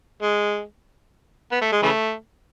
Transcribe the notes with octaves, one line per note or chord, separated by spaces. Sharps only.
G#3
B3
A3
G#3
C#3 E3 A3